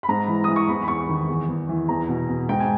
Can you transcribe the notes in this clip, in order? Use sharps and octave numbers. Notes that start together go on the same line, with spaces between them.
B5
G#2 A#5
E3
E3 D#6
C#6
E2 B5
B5
E2 C#6
D#3
E2
E2
E3
E2 A#5
B2
B2
G#2 G5
G#5